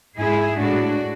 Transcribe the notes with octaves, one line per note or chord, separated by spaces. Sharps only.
G#2 G#3 E4 G#4
A2 G#3 D4 F#4